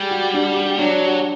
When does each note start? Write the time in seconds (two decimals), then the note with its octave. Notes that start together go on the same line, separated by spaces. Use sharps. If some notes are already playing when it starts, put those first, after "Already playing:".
Already playing: G3 G#4
0.11 F#4
0.33 D4
0.56 D4
0.78 F#3 D4
1.01 G4